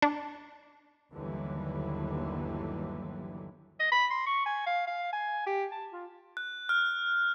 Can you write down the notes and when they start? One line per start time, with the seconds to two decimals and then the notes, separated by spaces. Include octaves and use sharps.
0.02 D4
1.12 G1 D#2 D3 E3 F#3 G3
3.80 D#5
3.92 B5
4.11 C6
4.27 C#6
4.46 G#5
4.67 F5
4.87 F5
5.13 G#5
5.47 G4
5.72 A5
5.93 F4
6.37 F#6
6.69 F6